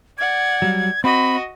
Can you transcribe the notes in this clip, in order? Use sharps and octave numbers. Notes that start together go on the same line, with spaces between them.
D5 F#5 G#6
F#3 G3
C4 F#4 D#5 B5